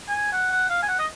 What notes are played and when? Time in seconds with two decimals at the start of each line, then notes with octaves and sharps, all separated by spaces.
0.09 G#5
0.33 F#5
0.51 F#5
0.69 F5
0.83 G#5
0.89 F#5
0.99 D#5